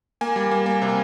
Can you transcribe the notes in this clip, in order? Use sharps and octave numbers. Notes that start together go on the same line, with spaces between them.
A#3 G#5
G3
A#3
A#3
C3